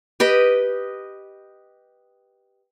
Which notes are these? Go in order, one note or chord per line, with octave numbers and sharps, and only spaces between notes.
G4 B4 D#5